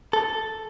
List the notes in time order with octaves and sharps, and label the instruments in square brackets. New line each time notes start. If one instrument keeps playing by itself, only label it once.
[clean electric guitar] A4